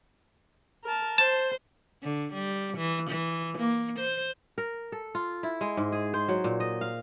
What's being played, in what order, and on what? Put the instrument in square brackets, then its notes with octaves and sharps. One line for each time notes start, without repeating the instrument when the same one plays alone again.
[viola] A#4 A5
[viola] C5 [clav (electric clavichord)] A5
[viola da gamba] D3
G3
E3
E3
A#3
C5
[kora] A#4
A4
F4
E4
G#3
G#2
G#4
C5
F#3
A#2
D#5
F5